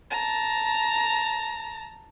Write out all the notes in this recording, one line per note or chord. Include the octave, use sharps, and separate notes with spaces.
A5 A#5